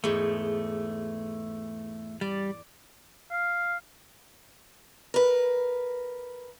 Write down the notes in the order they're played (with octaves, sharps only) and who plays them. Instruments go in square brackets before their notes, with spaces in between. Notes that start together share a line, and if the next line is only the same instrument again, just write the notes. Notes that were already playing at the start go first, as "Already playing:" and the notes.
[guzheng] E2 G#2 [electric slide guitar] A3
[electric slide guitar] G3 [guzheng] D5
[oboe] F5
[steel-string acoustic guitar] A#4 B4